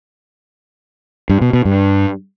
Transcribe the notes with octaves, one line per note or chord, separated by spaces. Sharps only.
G2
B2
B2
G2